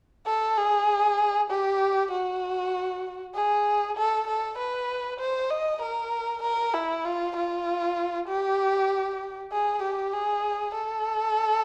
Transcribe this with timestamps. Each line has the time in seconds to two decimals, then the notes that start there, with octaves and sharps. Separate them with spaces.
0.26 A4
0.57 G#4
1.50 G4
2.12 F#4
3.35 G#4
3.97 A4
4.28 A4
4.58 B4
5.20 C5
5.50 D#5
5.82 A#4
6.43 A#4
6.74 E4
7.05 F4
7.36 F4
8.28 G4
9.52 G#4
9.83 G4
10.13 G#4
10.75 A4